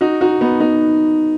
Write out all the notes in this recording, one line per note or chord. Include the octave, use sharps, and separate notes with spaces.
D#4 F#4
D#4 F#4
B3 D#4
B3 D#4